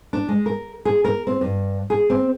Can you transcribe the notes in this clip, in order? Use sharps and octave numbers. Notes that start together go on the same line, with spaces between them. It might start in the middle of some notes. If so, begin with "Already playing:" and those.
D4
G#3
A#4
G#4
A#4
C4
G2
G#4
C4